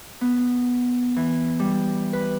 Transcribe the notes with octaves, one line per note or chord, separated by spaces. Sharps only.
B3
E3
G3
B4